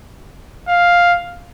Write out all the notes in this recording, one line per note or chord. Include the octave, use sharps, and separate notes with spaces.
F5